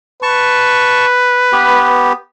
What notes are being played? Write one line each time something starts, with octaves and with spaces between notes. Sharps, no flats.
B4 A5 C#6
B3 G4